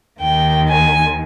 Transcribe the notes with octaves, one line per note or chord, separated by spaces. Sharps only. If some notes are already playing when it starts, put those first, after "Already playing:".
D#2 D#3 G5
G#5